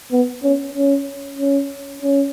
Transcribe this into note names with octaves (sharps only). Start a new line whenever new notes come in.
B3
C#4
C#4
C#4
C#4